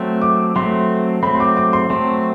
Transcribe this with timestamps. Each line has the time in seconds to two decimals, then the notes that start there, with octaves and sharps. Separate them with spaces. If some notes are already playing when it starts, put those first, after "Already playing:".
Already playing: F#3 A3 C4
0.21 D6
0.56 F#3 A3 C4 C6
1.23 F#3 A3 C4 B5
1.35 C6
1.40 D6
1.57 D6
1.73 C6
1.90 F#3 A3 C4 C6